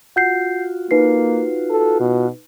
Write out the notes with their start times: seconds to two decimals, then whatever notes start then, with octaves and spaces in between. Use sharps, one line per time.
0.16 F4 F#4 F#5 G6 C7
0.91 A#3 D#4 B4 C7
1.70 A4
2.00 B2